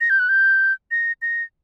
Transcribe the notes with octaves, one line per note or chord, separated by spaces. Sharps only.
A#6
G6
F#6
G6
A#6
A#6